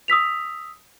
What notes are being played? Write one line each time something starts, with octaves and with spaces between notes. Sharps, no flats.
D#6 E6 B6 F7